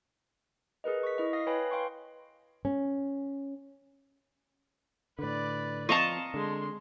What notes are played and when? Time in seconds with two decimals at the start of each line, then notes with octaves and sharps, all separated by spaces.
0.84 G#4 A#4 B4 D#5
1.03 C#6 B6
1.18 E4 D#5
1.33 F5 D#6 A#6 C7
1.47 B4 C#5 F5 G5 G#5 B5
1.71 F5 G5 C6 C#6
2.65 C#4
5.19 A2 D3 B4 D5
5.89 F3 C4 D#5 F5 A5 A#5 C#6
6.34 D3 G#3 C6